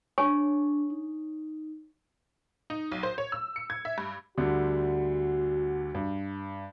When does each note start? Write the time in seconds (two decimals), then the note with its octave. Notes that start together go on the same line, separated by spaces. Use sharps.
0.18 D4 C#5 G#5 C#6
0.90 D#4
2.70 D#4
2.92 B1
3.03 C5
3.18 C#5
3.32 E6
3.56 C#7
3.70 G#6
3.85 E5
3.98 G2
4.37 D2 D3 G3 F#4
5.95 G2